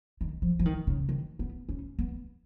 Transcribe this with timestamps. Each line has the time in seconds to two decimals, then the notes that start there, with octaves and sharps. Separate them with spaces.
0.21 D#3
0.42 F3
0.59 F3
0.65 D#3
0.87 C#3
1.09 D#3
1.39 B3
1.69 C#4
1.99 B3